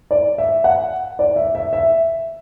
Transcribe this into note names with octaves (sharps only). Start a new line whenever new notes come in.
D5
E5
F#5
D5
E5
E5
E5